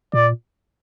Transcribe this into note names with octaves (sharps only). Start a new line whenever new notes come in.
A#2 D5